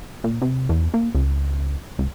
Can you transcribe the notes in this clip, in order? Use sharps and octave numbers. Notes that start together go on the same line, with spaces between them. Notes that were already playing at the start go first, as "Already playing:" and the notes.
A#2
C3
E2
A#3
C#2
C#2